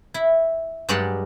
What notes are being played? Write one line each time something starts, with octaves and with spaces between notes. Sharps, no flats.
E4
G2 F#3 G#3 G4 D5 F#5